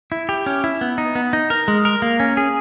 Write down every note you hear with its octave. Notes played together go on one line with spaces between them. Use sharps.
E4
G4
C#4
E4
B3
D#4
B3
D#4
A#4
G#3
A#4
A#3
C#4
G#4